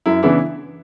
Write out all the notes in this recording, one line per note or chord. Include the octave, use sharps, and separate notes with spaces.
F#2 E4
C#3 E3 B3 D4 E4